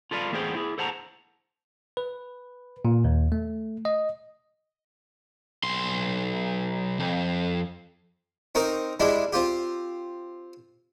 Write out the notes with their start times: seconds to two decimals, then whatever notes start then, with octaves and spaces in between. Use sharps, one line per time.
0.11 F4 A4 B4 D5 F5
0.32 E2 A3 B3 G#4 C5 G5
0.55 E4 G#4
0.78 A4 C5 F#5 A5 A#5
1.97 B4
2.85 A#2
3.05 D#2
3.32 A3
3.85 D#5
5.63 B1 C6
7.00 F2
8.55 C4 D#4 A#4 C#6
9.00 G3 G#3 D4 E4
9.33 C4 F4 G4